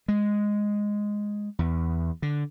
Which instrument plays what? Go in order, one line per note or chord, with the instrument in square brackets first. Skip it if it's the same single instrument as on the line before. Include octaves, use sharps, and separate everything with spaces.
[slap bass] G#3
E2
D3